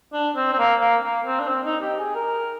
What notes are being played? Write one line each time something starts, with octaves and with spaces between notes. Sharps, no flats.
D4
C4
C4
A#3
A#3
A#3
C4
D4
C4
D#4
G4
G#4
A#4